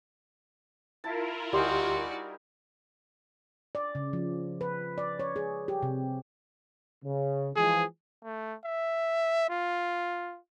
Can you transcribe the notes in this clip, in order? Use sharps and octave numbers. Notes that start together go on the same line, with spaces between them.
E4 F4 A#4 A5
D2 G3 D#4 F#4 G4 D5 G#5 C6
D5
C#3
F3
B4
D5
C#5
G#4
G4
C3
C#3
E3 F3 G#3 G#4
A3
E5
F4